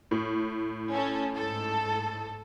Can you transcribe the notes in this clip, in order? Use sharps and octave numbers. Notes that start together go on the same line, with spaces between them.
A2
C#4 A4
G#2 A4